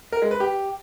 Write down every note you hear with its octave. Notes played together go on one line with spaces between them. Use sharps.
A#4
G#3
B4
G4